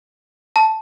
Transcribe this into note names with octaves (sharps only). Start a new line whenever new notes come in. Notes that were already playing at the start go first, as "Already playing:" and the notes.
A5